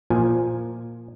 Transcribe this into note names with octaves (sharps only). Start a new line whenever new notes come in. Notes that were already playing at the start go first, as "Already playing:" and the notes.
A#2 F3 G#5